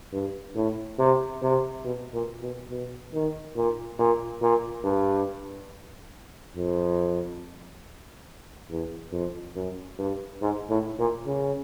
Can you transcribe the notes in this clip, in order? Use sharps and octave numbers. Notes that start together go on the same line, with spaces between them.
G2
A2
C3
C3
B2
A#2
B2
B2
D#3
A#2
A#2
A#2
G2
F2
E2
F2
F#2
G2
G#2
A2
A#2
C#3